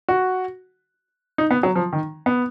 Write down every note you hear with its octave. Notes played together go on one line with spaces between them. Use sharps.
F#4
D#4
B3
F#3
F3
D#3
B3